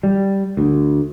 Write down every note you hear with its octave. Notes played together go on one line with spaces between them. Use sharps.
G3
D2